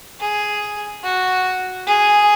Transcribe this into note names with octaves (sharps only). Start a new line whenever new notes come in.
G#4
F#4
G#4